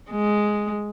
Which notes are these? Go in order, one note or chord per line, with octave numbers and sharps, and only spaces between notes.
G#3